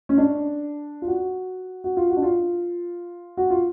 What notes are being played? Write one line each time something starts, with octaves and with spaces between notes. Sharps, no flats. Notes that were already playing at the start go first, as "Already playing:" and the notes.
C#4
D4
F4
F#4
F#4
F4
F#4
D4
F4
F#4
F4